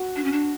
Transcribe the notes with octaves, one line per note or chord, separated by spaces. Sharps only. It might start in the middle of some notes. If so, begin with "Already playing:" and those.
Already playing: F#4
D4
C#4
D4